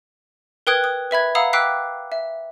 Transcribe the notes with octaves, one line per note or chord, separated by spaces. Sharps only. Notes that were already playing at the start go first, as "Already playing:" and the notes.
A#4 B4 G5 D#6 F#6 G#6
D#6
B4 E5 B5 G#6
F5 F#5 A#5 B5 D#6 E6
G5 D6 E6 F#6 B6 C7
E5